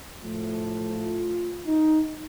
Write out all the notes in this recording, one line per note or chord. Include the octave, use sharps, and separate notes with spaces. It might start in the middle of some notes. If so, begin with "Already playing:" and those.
A2 F3 A3
F4
D#4